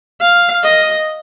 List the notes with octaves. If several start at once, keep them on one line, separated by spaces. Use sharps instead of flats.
F5
D#5